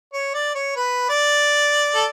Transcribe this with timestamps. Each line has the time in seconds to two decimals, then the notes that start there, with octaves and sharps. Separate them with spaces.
0.13 C#5
0.34 D5
0.55 C#5
0.76 B4
1.09 D5
1.95 A4